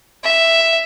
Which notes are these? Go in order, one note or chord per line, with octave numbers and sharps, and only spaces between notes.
E5